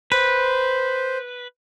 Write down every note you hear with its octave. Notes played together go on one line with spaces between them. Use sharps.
B4 C5